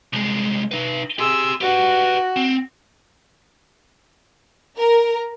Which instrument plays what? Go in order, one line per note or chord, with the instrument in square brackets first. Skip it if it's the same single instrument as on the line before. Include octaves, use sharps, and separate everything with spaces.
[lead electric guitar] C2 G#3
D#4 B4
[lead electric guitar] G4 C6 [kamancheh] G#4 E6
[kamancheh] F#4 [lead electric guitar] G4 B4
[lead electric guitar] C4
[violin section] A#4